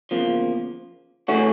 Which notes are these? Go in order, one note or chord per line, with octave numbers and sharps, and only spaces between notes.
E2 C#3 F3 A#3
C#3 E3 A3 C#4 F#4